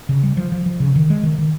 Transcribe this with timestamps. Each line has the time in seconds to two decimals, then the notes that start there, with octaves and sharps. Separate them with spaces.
0.09 C#3
0.23 G3
0.37 F3
0.52 F3
0.66 F3
0.80 C#3
0.96 D#3
1.10 G#3
1.23 D#3
1.38 D#3